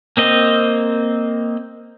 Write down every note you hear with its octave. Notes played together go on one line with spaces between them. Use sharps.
A#3 C4 D#5